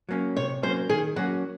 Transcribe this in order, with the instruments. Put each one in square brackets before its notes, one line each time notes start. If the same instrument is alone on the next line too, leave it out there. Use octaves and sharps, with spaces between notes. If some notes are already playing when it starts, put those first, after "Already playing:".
[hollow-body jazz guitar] F#3 A#3 C#4
[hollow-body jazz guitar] C3 [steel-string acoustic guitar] C#5
[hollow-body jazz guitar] F#3 A#3 C#4 [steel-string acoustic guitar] C5
[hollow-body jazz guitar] D#3 [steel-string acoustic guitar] G#4
[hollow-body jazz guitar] F#3 A#3 C#4 [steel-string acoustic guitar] F#4